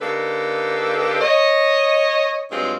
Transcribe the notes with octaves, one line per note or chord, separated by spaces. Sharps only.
D3 A#3 D#4 G4 A4 B4
C#5 D#5
G2 F#3 G#3 C4 F4